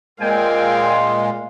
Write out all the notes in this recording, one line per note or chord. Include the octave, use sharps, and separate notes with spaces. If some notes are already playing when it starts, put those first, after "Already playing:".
A#2 G#3 C4 A#4 F5 G5 G#5
C6